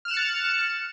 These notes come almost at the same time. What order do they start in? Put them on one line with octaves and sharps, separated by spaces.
F6 E7 F#6 C#7 A6